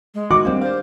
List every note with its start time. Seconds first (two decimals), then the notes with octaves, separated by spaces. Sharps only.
0.15 G#3
0.31 D#3 F#4 D6
0.45 G3 A#3 C4 D4
0.61 C5 D5 F5